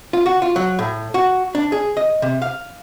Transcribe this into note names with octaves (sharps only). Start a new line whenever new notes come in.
F4
F#4
F4
F#3
A2
F#4
D4
G#4
D#5
C3
F5